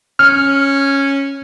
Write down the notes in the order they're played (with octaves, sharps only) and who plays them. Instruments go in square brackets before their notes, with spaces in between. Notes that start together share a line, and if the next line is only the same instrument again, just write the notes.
[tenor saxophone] C#4 [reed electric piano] F6